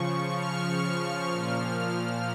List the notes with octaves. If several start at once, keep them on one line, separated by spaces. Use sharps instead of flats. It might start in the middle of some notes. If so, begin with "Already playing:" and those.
Already playing: C#3 F3 C#6
F6
A#2 F3